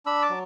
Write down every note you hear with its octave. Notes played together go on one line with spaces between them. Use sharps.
D4 B5 E6
A5 D6
F#3